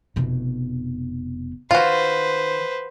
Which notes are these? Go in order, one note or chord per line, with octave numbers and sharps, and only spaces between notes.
F1 B2
D#3 F4 F#4 B4 C5